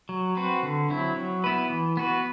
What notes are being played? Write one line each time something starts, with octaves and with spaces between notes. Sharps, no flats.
F#3
C4 F#4 B4
D3
F#3 C4 E4
F#3
B3 E4 B4
E3
B3 F#4 B4